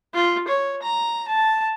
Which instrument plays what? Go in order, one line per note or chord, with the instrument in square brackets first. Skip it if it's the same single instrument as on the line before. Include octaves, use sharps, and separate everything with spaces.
[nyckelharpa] F4
C#5
A#5
A5